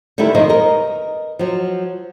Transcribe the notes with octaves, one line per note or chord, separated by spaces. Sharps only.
D3 D#3 G3 A3 E4 A#4
F2 D#3 F3 A#3 C5 D#5
A#4 D#5
F3 F#3